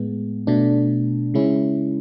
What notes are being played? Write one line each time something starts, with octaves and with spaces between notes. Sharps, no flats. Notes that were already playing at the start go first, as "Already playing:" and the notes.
Already playing: A2 G#3 B3
B2 A3 D4
C#3 G#3 C#4 E4